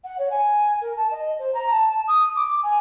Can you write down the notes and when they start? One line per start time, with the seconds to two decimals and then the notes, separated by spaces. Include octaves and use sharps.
0.04 F#5
0.18 C#5
0.31 G#5
0.81 A#4
0.97 A5
1.11 D#5
1.39 C5
1.54 A#5
1.71 A5
2.08 D#6
2.35 D6
2.63 G#5